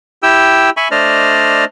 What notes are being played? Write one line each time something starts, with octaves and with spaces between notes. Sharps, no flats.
E4 G4 G5 E6
E5 G#5 B5 C#6
A3 D4 C5 D5 D#5 F6